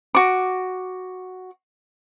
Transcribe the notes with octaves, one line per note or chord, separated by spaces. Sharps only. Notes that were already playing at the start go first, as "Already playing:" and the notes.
F#4 D6